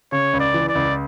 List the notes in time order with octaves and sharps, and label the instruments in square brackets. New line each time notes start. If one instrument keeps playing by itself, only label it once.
[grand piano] C#3 [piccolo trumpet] C#5
[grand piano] C#2
[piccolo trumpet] D5
[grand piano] E3
[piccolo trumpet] D5
[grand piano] C#2